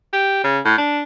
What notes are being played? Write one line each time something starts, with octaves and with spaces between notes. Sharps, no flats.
G4
C#3
A2
D4